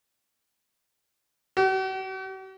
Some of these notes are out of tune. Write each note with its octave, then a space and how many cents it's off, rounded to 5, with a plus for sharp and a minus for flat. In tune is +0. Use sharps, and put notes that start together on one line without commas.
F#4 +45